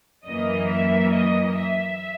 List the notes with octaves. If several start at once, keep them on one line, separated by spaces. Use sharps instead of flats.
F#2 E3 A#3 D#5
E5
D#5
E5